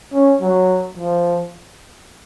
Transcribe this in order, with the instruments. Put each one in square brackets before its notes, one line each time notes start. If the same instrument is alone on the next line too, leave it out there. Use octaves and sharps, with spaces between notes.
[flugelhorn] C#4
F#3
F3